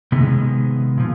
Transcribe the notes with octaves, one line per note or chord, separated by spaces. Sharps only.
C3 D#3 G#3 B3
A#2 F3